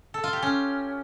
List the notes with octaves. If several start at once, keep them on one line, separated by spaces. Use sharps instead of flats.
A4
F4
G4
C#4